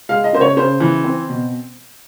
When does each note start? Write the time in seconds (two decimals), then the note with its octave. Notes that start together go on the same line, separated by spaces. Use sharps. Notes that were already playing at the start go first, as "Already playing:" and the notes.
0.09 G#3 F5
0.24 D#5
0.33 C#3 C5
0.41 C#5
0.57 C#3 C5
0.80 E3
1.04 C4
1.29 B2